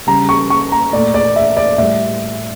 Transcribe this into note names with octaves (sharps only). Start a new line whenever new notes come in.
C#3 G3 A#5
C#6
C#6
A#5
A#2 A3 D5
D5
E5
D5
A2 G3 E5